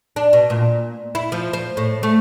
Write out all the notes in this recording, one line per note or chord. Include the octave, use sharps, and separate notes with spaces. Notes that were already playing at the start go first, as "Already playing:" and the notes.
D4
B2
A#2
E4
F3
C5
A2
A3